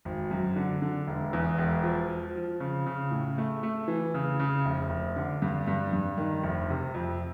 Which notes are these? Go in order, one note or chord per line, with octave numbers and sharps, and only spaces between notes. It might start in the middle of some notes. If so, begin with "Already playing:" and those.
G#1
F#2
D3
D3
E1
E2
E1
F3
F3
F3
C#3
C#3
A2
A3
A3
E3
C#3
C#3
F1
F1
D3
G2
G2
G2
D#3
F1
C3
F2